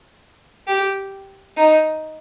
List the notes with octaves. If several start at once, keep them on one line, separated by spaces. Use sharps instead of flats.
G4
D#4